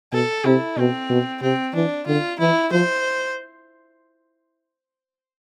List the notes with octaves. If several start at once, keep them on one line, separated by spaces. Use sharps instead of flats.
B2 A4
C3 E4
B2 C4
B2
C3 C4
E3 D4
D3 F4
E3 E4
F3 C5